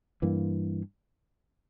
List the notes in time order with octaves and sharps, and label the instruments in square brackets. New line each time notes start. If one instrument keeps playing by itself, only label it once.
[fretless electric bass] G2 E3 A#3